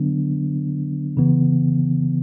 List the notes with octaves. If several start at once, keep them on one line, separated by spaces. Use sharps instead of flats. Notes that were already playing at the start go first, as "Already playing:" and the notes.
Already playing: D3 F#3 B3 D4
C#3 E3 B3